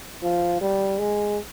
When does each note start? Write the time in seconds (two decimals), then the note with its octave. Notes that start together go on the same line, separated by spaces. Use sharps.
0.23 F3
0.61 G3
0.99 G#3